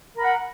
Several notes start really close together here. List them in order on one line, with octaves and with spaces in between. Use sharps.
A#4 B5 F#5